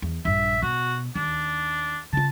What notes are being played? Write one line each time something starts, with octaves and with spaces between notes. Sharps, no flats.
E2
A#1 G2 E5
B2 F#4
D#2 D4
C#3 F4 A5